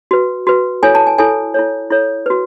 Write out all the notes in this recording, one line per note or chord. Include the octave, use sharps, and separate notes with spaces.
F#4 B4
F#4 B4
E4 A4 C#5 G#5
A5
G#5
E4 A4 C#5 G#5
E4 A4 C#5
E4 A4 C#5
F#4 B4